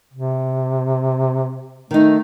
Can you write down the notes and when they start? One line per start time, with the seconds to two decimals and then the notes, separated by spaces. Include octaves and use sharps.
0.14 C3
1.91 D#3 A3 D#4